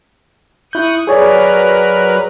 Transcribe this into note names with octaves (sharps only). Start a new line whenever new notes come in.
E4 C#6 D#6 F#6 G6
F#3 G#4 A#4 B4 C#5 D5